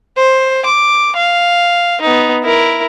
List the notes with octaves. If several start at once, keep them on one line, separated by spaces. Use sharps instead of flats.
C5
D6
F5
B3 D#4
E4 A#4